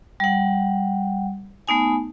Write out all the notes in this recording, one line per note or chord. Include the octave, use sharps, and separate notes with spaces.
G3 F#5
A3 B3 D#4 G#5